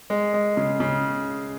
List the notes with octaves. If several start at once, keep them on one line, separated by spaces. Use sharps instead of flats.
G#3
G#3
C#3
C#3